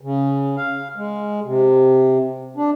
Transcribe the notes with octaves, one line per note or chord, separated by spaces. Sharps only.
C#3
F5
G#3
C3
D4